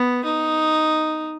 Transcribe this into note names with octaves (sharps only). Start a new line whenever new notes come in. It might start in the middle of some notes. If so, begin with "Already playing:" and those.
Already playing: B3
D#4